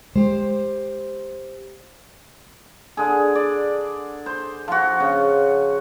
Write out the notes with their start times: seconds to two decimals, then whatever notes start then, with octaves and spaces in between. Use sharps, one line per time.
0.16 G#3 G4 C5
2.97 D3 G#4
3.35 D5
4.26 C5
4.68 F3 F#4
5.00 C#3